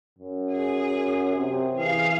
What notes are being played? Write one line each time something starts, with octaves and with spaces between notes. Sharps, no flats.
F#2
G#4
C3
E3 G#4 F5